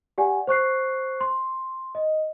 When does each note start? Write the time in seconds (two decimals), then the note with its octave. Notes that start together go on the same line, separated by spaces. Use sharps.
0.18 G4 D5 F#5 G#5
0.47 C5 C#6 F#6 C7
1.21 C6
1.95 D#5